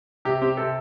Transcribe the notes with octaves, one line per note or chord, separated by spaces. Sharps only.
C3 G4
C4 G4
C3 A4